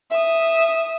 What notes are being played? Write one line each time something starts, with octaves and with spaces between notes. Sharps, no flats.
E5 D#6